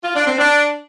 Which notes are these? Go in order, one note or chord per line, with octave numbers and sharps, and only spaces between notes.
F4
D4
C4
D4